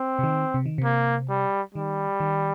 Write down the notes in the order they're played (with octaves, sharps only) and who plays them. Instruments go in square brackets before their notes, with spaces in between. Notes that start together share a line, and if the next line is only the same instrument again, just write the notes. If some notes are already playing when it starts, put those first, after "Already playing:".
Already playing: [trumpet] C4
[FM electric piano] C3
D#3
C3
D#3
C3
[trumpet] A#3
G3
[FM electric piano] D#3 [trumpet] G3
[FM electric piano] D#3